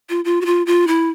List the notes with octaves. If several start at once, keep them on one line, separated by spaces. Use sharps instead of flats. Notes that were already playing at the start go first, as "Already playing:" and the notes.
F4
F4
F#4
F4
F4
E4